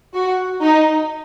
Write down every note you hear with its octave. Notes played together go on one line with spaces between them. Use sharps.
F#4
D#4